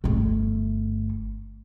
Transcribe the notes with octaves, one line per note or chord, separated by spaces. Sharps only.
G1 A3